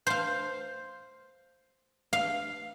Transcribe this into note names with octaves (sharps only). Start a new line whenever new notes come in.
C5 F5
F5